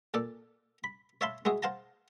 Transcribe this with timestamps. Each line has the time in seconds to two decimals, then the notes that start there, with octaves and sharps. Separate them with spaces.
0.14 A#2 A4 D5
0.84 B5
1.21 C#5 E5 F5 A5 B5 C6
1.45 G#3 E4 F#4 G#4
1.62 C5 F5 F#5 A5 A#5